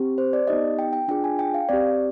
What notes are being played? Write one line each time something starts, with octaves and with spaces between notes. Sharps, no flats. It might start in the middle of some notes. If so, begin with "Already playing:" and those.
Already playing: C4 G4
C5
D5
B3 D#4 G4 D#5
G5
G5
D4 F4 G#4 G5
G#5
G5
F5
C4 G4 D5